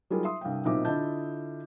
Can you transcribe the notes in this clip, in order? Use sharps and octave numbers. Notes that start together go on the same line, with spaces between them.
F#3 G3 D#4 F4 G#4 A#4
E5 C6 D#6
C2 G2 F5 G5
B1 A#2 C4 D#4 E5 D6
D3 E4 F4 D#5 A5 G6